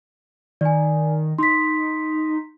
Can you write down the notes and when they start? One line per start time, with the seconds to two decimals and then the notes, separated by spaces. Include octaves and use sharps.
0.61 D#3 D5 G#5
1.38 D#4 C6 B6